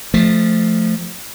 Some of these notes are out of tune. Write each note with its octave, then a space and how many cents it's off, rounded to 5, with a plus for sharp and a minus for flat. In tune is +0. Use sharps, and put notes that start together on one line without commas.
F3 +0 A3 +0